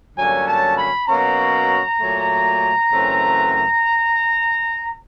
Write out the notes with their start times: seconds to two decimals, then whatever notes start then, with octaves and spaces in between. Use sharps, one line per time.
0.16 G2 D3 F#3 A#3 C#4 G#5
0.47 A5
0.77 B5
1.08 B2 F#3 A#3 C#4 A#5
2.00 A#2 F#3 A3
2.91 F#2 C#3 E3 A3 C4